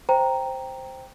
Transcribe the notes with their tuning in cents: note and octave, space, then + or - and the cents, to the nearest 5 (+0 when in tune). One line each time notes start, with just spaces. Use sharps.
C5 +0 G5 +0 A#5 +0